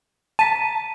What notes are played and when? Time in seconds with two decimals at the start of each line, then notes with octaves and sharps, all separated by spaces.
0.39 A5 A#5 B6 D#7